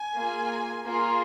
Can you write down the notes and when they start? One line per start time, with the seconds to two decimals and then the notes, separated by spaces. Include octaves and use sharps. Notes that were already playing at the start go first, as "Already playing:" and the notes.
Already playing: G#5
0.15 A#3 F4 G#4
0.86 A#3 F4 G#4